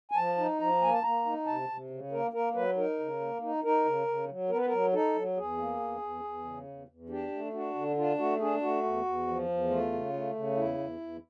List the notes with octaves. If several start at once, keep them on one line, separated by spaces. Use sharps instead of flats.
G#5
F3 A5
D#4
F3 A#5
A#3 G#5
A5
A#3 A#5
D#4
C3 A5
C3
C#3
A#3 A#4
A#3 A#4
F#3 B4
D#4 A#4
C#3
A#3
D#4
D#4 A#4
C#3
C#3
F#3
B3 A#4
B4
F#3 A#4
D#4 A4
F#3
E2 G#4
A#3
E2
E2
E2
C#3
E2
E2
D4 G4
A3
D4 F#4
D3
D4 F4
A3 F#4
D4 G#4
A3 F#4
E2
E2
F3
E2
A3 F4
C#3
A3
C#3
E2 E4
E2
E2